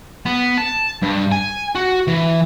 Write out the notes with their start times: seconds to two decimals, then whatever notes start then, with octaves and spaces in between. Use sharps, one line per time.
0.26 B3
0.58 A5
1.02 G2
1.32 G#5
1.75 F#4
2.07 E3